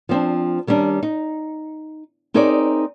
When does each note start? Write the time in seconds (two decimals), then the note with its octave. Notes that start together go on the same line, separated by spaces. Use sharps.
0.09 F3 C4 D4
0.67 D#3 G3 C#4 D4
1.03 D#4
2.34 C4 D#4 G#4 A#4 C#5 D5